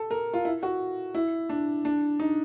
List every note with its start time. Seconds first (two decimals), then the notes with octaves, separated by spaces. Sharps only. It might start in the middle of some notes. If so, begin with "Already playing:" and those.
Already playing: A4
0.11 A#4
0.33 F4
0.45 E4
0.63 F#4
1.15 E4
1.49 D4
1.85 D4
2.20 D#4